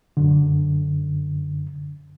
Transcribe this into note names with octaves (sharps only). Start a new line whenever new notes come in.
F#2 D3